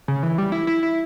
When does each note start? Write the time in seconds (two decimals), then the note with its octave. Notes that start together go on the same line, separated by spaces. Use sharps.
0.08 C#3
0.23 E3
0.38 G3
0.52 E4
0.67 E4
0.83 E4